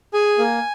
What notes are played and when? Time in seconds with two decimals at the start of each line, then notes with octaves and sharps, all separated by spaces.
0.13 G#4 G#5
0.38 A#3